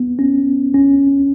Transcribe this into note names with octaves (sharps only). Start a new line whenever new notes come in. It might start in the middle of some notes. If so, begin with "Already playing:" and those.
Already playing: B3
C#4
C#4